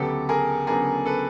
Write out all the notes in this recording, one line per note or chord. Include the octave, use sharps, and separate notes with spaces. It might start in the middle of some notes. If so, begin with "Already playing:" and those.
Already playing: D2 C#3 F#3 B3 D4 G4 A4
G#4 A#4
D2 C#3 F#3 B3 D4 G#4 A#4
A4 B4